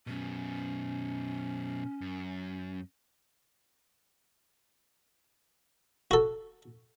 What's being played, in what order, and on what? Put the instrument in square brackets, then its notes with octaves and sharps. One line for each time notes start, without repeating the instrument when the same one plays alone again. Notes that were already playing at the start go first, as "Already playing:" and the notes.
[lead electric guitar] F#2 B2 [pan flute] C#4
[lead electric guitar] F#2
[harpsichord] F#4 A4